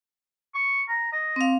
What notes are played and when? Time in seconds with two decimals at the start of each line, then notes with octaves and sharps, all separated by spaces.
0.54 C#6
0.88 A#5
1.12 D#5
1.36 C4 F5